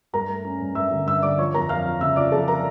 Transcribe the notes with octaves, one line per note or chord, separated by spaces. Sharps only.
G2 A#4 A#5
A3
C#4
G2
G2 E5 E6
D3
G2 E5 E6
D3 D5 D6
F3 C#5 C#6
F2 A#4 A#5
F2 F5 F6
F3
C#3 E5 E6
F3 D5 D6
F2 A4 A5
A#4 A#5